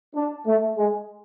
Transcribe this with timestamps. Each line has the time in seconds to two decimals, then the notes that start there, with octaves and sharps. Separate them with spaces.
0.15 D4
0.46 A3
0.77 G#3